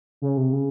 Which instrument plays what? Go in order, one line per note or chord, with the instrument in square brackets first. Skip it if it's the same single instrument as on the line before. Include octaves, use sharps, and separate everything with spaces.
[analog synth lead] C#3
C3
C#3